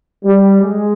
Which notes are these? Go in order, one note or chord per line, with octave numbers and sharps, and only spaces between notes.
G3
G#3